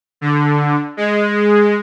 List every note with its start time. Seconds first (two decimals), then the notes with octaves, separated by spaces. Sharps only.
0.21 D3
0.97 G#3